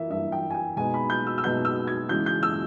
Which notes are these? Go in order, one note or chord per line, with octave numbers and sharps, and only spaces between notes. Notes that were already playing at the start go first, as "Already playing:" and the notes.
Already playing: E3 A#3 E5
G2 E3 A#3 E5
G5
G#5
G5
B2 G#3 B3 D#4 G#5
B5
G6
E6
E6
B2 G#3 B3 D#4 G6
E6
G#6
C#3 E3 G#3 G6
G6
E6